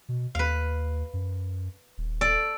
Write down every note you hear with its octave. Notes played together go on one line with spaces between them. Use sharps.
B2
D#2 B4 F5
F#2
D#1
A4 D5